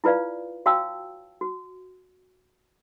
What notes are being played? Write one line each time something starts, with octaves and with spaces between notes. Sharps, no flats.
E4 F4 B4 D5 F5
F#4 C#5 F5 G5 A5 E6
F#4